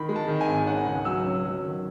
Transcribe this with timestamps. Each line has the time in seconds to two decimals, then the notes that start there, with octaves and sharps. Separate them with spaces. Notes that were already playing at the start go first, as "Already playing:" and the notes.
Already playing: D#3 B5
0.09 G#3
0.16 A5
0.28 D#3
0.41 G#5
0.48 G#1
0.66 C#4 F#5
0.77 G#5
0.86 C#2 F#5
1.05 F#3 E6
1.25 C#4
1.44 F#3
1.63 D#3